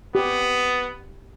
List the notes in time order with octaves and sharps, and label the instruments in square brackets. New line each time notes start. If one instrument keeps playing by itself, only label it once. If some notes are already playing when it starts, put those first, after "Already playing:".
[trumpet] B3 [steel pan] G4